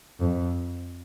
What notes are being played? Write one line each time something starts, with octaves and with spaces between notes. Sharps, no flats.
F2